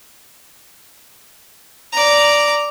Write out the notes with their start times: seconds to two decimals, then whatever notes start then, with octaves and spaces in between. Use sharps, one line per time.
1.93 D5 A#5